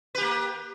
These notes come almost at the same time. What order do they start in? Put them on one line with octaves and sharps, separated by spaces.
B4 G4 A#3